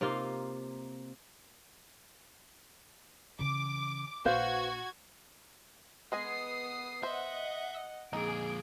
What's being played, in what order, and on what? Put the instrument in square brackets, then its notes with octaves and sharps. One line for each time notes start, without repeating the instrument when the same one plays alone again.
[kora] C3 A#3 D#4 F4
[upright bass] C#3 E3 [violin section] D6
[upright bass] A#1 [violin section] F#4 G#6 [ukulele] B4 C5 F5
[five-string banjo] G#3 D#5 G#5 [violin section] B3 D#6 C7
[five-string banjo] C5 [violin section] D#5 F#5 [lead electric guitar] E5
[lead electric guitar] F2 A#2 [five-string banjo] D#4 [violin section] G#4 D7